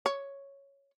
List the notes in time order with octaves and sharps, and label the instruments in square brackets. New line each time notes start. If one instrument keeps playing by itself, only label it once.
[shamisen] C#5